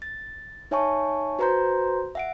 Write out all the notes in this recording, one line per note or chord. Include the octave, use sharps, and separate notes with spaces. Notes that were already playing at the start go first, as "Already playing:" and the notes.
A6
D#4 C#5 E5 G#5 A5 C#6
F#4 B4 C5 A#5 C6 G6
E5 F#5 D7